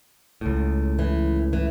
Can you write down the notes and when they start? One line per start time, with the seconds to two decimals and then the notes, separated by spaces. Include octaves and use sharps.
0.41 C#2 A2
0.99 E3
1.53 E3